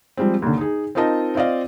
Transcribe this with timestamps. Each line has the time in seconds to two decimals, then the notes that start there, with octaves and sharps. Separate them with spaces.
0.17 F3 G3 G#3 C4
0.42 D#2 D3
0.57 D#4 G#4
0.95 C4 D#4 F4 A#4 D#5 A5
1.35 C4 F4 D5 D#5 F5